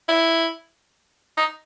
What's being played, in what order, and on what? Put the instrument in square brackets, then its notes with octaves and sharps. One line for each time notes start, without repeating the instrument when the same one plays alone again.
[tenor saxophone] E4
D#4